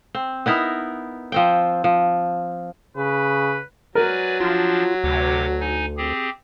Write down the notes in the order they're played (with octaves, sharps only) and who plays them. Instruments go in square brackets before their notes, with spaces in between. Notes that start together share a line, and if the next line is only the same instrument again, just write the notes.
[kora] C4
B3 D#4 E4 A#4
F3 C4 G5
F3
[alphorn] C#3 [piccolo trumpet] B4
[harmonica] F#3 [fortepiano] A#4 [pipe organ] B4 D5 G#5
[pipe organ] F3 D4 A6 [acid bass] F4
[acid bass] D2 [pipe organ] C3 C#5 D6
[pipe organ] D#4 G#5
C4 G4 G#4